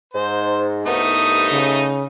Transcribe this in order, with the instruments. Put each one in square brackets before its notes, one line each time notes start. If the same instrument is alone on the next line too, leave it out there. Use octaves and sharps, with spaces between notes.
[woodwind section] G#2 [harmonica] C5
[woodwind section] C2 G2 B3 [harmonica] A3 D#4 D#5
[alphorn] C#3